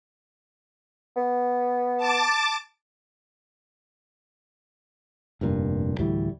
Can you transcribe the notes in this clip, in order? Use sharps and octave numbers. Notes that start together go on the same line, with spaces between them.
B3
A5 D6 A6
F1 G2 A#2
D2 A2 E3 G3